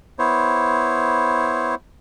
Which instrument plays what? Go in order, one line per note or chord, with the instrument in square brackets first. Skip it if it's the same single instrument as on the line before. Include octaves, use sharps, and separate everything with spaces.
[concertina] B3 E4 C5 C#5